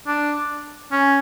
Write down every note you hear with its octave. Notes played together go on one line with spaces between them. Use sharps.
D4
C#4